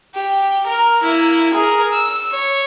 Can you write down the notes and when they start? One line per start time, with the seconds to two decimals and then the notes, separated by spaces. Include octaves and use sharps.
0.15 G4
0.67 A#4
1.02 A#3 E4
1.54 G#4 A#4
1.93 E6
2.32 C#5